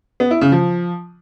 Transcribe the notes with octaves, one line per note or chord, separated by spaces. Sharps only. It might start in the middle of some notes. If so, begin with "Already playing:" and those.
B3
E4
C#3
F3